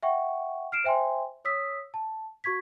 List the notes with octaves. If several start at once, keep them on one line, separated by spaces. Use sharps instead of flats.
E5 F#5 G5 C#6
F6 C7 D7 E7
C5 E5 G5 G#5 C6
C#5 D#6 E6 B6
A5
F#4 C#6 G#6 B6